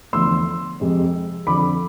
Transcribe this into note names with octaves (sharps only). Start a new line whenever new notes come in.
E2 D3 F3 A3 C6 E6
F2 C3 G#3 C4
F2 D3 F3 B5 D6